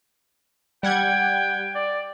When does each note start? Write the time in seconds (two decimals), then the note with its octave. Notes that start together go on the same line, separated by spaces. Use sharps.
0.83 G3 F#5 G5 G#6
1.75 D5